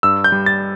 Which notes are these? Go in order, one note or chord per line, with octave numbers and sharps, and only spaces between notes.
G2 E6
G6
G3
A6